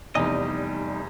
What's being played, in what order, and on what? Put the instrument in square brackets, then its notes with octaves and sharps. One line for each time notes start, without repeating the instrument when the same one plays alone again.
[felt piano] F1 E2 [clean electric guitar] G3 D#4 D#5